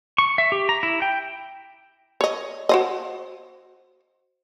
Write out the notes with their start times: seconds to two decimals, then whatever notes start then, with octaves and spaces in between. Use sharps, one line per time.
0.18 C#6
0.38 E5
0.52 G4
0.69 A#5
0.83 E4
1.02 G5
2.21 C#5 D#5
2.69 F#4 C5 D#5